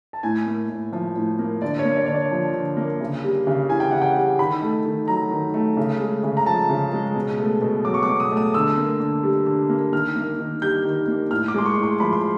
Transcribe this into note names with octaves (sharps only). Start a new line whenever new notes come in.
A5
A2 G#5
A#3
A2
F3
A2
A#3
D3 D5
C#5
A#3
D5
D3 C#5
D5
F3
D3
A#3
C#3
G3
C#3
E3 G#5
G5
C#3 F#5
G5
G3
D#3 B5
A3
D#3
F#3 A#5
D#3
A3
C#3
G#3
C#3
A#5
F3 A5
C#3
G#3
B2
A3
B2
F#3 D6
C#6
D6
B2
D#6
A3
D#6
D3 E6
A#3
D3
G3
D3
A#3
D#3 F6
A#3
D#3
G3 G6
D#3
A#3
A2 F6
D6
G#3 C6
C#6
A2
C6
F3 B5
C6